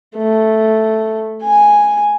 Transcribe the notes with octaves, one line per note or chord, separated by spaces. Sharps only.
A3
G#5